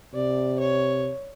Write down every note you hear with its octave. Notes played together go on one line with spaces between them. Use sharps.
C3 D5
C#5